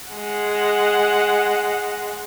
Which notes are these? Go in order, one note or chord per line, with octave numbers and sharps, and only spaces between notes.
G#3 F#5